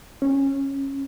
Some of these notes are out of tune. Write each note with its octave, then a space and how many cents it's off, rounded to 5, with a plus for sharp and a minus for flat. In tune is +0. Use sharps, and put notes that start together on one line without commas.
C#4 -15